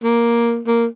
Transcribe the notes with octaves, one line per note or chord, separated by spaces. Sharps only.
A#3
A#3